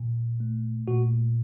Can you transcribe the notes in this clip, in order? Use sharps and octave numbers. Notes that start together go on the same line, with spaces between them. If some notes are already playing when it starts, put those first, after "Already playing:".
Already playing: A#2
A3
A#2 F#4